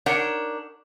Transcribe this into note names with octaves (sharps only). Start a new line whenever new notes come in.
D4 D#4 G4 A#4 C#5 F#5